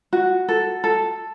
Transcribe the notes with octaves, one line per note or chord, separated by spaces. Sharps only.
F#4
A4
A4